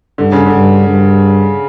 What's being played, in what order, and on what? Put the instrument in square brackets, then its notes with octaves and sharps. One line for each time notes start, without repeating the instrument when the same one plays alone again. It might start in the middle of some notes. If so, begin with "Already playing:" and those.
[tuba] G2 [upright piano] D3
[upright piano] C#3
D3
[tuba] G2
G2